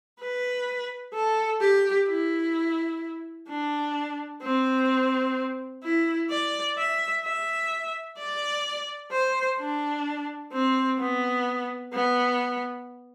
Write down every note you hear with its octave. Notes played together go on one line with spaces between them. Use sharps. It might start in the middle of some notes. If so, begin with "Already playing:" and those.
B4
A4
G4
E4
D4
C4
E4
D5
E5
E5
D5
C5
D4
C4
B3
B3